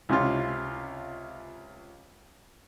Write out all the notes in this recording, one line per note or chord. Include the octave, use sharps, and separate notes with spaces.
C#2 C3 C#4 F4